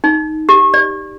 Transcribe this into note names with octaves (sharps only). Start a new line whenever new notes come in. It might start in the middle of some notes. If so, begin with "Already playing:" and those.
D#4
G4
D5